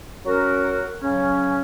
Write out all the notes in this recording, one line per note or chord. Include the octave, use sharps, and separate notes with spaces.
F#3 C#4 F#4 A#4
C#3 F#3 C#4